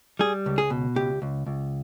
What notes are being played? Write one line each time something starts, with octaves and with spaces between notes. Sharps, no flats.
G3 G#4
C#2
G#4
B2
C#2 G4
C#2
C#2